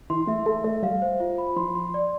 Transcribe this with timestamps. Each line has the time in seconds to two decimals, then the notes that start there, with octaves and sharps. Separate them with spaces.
0.10 E3 C6
0.27 A3 E5
0.46 A3 E5
0.64 A3 E5
0.82 G3 F5
1.02 C5
1.20 F4
1.38 B5
1.56 F3 C6
1.75 C6
1.94 D5